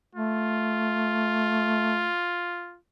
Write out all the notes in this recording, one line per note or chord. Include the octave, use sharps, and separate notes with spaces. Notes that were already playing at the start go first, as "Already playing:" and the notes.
A3 F4